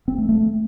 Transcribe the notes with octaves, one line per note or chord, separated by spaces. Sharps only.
C4
A3
A3